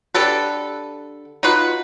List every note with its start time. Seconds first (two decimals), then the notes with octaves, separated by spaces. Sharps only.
0.14 D3 G4 A4 B4
1.43 D#4 F4 F#4 B4